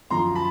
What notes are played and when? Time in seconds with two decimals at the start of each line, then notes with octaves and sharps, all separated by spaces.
0.10 F#2 D3 F3 A#5 C6
0.35 A5 B5